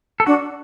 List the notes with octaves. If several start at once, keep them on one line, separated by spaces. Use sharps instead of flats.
A4
D4 F#4